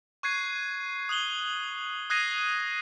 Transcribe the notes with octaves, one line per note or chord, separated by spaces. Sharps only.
C#6 F#6 G#6 C7 D#7
D#6 F#6 F#7 G7
D#6 F#6 G#6 A#6 C7 D#7